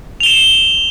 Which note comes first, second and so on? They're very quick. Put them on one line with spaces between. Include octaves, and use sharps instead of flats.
F7 G7 E7